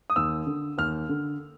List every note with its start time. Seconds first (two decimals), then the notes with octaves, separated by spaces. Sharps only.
0.10 D#6
0.16 D#2 E6
0.47 D3
0.78 D#2 F6
1.09 D3